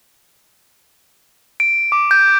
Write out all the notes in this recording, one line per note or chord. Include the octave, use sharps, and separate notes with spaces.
D7
D6
G6